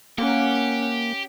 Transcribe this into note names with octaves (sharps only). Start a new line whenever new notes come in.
A#3 C#4 G4 F#5